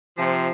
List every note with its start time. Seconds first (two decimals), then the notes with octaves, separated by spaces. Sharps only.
0.18 C3 F3